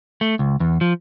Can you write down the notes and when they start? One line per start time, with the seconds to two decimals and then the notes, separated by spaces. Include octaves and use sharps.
0.21 A3
0.39 C#2
0.60 E2
0.81 F3